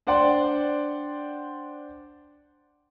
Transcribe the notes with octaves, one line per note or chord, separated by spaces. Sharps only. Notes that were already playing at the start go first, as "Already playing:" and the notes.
D4 C5 D5 F#5 G5 C6